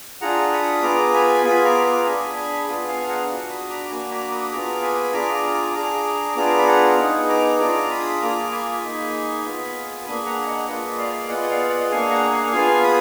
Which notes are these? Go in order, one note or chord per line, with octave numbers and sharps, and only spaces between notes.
D4 F4 G#4 F#5 A#5
B5 D#6
B3 F4 G#4 A#5 D6
G#5 B5
B3 F4 G#4 G#5 B5
A#5 D6
A#5 D6
D4 G#4 G#5 B5
G#5 B5
B3 D4 F4 G#4
F5 G#5
F#5 A#5
D4 F#4
B5 D#6
A#5 D6
A#3 D4 F#4 G#5 B5
A#5 D6
B5 D#6
B3 F4 G#4 A#5 D6
G#5 B5
D4 F4 G#4 A#5 D6
A#5 D6
A#5 D6
D4 G#4 A#5 D6
B3 D4 F4 G#4 A#5 D6
B5
F#5 A#5
B3 D#4 G#4
A#5 D6
D4 F4 G#4 A#5 D6
B5 D#6
A#3 F4 G#4 A#5 D6
G#5 B5
A#3 D#4 G#4
B3 F4 G#4
A#3 D4 G#4 G#5 B5
F#5 A#5
D#5 F#5
A#3 F4 G#4 B4 D#5
D5 F5
B3 F4 G#4 D#5 F#5
D5 F5
D#5 F#5
A#3 D4 G#4 F5 G#5
F#5 A#5
F5 G#5
B3 F4 G#4 F5 G#5
B5 D#6